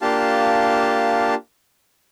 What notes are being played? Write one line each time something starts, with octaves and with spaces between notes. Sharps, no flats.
A#3 D4 F4 G4 F5 A5